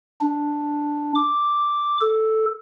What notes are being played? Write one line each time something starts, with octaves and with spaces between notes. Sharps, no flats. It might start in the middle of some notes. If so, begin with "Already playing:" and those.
D4
D6
A4